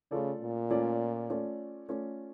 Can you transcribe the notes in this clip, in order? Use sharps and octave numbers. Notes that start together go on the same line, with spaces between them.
C#3 A3 C#4 F4 A4 D5
A#2
A3 C#4 F4 A4 D5
A3 C#4 F4 A4 D5
A3 C#4 F4 A4 D5